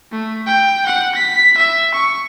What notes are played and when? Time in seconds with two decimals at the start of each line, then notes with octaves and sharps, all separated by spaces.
0.12 A3
0.46 G5
0.86 F#5
1.15 B6
1.57 E5
1.94 C#6